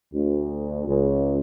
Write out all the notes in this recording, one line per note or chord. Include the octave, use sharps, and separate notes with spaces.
D2
C#2